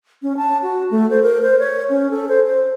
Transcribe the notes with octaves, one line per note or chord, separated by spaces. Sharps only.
C#4
A5
F#4
A3
C5
A#4
C5
C#5
C#4
A4
C5
C5